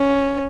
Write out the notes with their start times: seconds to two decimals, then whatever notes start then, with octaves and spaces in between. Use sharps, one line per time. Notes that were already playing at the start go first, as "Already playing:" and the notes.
Already playing: C#4